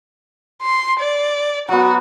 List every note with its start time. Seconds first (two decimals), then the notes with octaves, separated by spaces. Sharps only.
0.62 C6
1.00 D5
1.69 F#3 B3 F#4